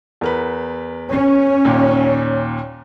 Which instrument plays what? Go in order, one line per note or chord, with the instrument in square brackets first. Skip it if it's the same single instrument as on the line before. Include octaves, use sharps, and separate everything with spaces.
[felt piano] E2 A#4 B4
[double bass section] C#4
[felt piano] D#2 A#2